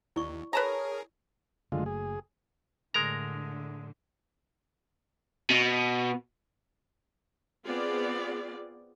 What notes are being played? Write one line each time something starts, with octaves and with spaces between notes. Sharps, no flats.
D#2 E4 D5 C#6
G#4 A#4 B4 C#5 A5 A#5
F#1 D3 F#3 G#3 A3 F4
G#4
A2 D3 G#3 A#4 A#5
B2
B3 C4 F4 G#4 D5